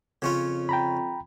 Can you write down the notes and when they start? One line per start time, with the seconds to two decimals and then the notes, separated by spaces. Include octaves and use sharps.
0.22 F2 C#3 C#4 F4
0.69 G5 A#5 B5